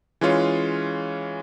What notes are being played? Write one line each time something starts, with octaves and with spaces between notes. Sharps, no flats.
E3 G#3 C#4 F4 C#5